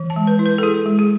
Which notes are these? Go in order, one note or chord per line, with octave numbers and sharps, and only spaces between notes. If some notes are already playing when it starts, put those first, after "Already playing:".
Already playing: E3
A5
G#3
B4
E4
B4
A4
E4 G#4
G#3
G#4